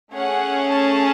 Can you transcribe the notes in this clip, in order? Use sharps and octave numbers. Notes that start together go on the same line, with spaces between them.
A3 C#4 G#4 F#5
A5